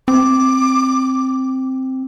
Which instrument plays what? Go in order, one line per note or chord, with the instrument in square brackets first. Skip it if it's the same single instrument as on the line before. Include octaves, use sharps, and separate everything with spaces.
[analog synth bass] C4 [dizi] D6